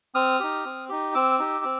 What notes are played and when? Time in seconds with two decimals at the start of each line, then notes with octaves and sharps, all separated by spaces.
0.15 C4 D#6 F6
0.40 D#4 G4
0.65 C4
0.89 D#4 G4
1.15 C4 D6 E6
1.39 D#4 G4
1.65 C4